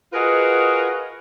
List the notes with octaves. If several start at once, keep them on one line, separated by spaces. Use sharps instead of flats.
F4 F#4 G#4 A#4 B4 D#5